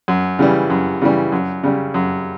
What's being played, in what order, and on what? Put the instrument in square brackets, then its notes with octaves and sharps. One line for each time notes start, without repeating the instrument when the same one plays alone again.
[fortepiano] F#2
C#3 E3 G3
F#2
C#3 E3 G3
F#2
C#3 G3
F#2